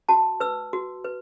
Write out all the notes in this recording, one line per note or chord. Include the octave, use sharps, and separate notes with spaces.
F#4 A5
B4 E6
F#4
B4